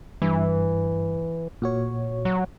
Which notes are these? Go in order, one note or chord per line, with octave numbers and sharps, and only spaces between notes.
G2 E3
A#2 F#4 C#5
F#3